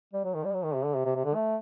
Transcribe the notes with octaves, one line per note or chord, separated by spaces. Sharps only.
G3
F#3
D#3
G3
F#3
D#3
C3
D3
C3
C3
C3
D3
A3